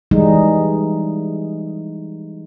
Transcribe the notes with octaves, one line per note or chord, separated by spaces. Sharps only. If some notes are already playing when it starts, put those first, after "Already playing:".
E3 G3 G#3 D#4